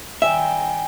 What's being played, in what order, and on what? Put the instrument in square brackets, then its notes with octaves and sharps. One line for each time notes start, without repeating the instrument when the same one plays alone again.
[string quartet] D#3 G3 G5 [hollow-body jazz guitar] E5 [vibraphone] G#5